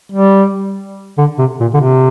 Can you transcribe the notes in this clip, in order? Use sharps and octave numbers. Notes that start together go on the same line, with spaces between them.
G3
D3
C3
A#2
D3
C3